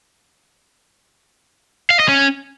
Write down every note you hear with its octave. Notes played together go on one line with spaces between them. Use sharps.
F5
D#5
C#4